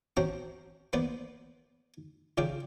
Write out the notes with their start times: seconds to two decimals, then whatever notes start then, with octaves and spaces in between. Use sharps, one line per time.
0.17 C4 C#4 F#4 C5 G5 A#5
0.93 A#3 B3 B4 C5 D5
2.38 C#2 C#3 F4 D5 G5